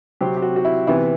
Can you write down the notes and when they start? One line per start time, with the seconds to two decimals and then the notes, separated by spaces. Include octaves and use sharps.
0.21 C3 F#3 C4 G4
0.37 G4
0.42 F#4
0.56 F#4
0.65 E4
0.87 C3 E3 B3 E4